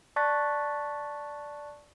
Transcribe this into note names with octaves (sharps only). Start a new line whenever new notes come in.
D5 A5 C#6 F#6 A6 B6